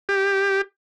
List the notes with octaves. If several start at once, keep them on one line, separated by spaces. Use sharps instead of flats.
G4